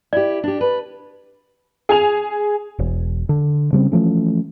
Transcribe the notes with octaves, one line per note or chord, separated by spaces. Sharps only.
E4 G4 D5
D4 G4
B4
G#4 G#5 F7
E1
D3
C#3 G3 B3 C4
E3 F3 A3 C#4